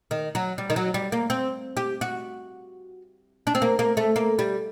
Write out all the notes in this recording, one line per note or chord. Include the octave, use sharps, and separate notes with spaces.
D#3
F#3
G3
D#3
F#3
G3
A#3
C4
G4
F#4
D4
C4
A#3
A#3
A3
A#3
G3